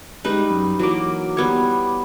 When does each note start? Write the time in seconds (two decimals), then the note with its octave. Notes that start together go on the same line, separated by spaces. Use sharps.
0.25 G3 G#3 D#4 B4
0.50 F#2
0.79 E3 F#3 A#3 D6
1.37 G3 B3 C#5